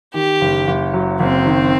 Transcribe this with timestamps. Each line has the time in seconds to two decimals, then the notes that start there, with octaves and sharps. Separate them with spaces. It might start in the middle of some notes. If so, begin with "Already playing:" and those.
0.14 D#3 G4
0.41 F#1
0.67 F#1
0.94 F#3
1.20 F#1 C4
1.45 D#3